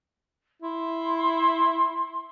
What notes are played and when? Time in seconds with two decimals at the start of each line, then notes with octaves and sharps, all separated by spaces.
0.62 E4 C6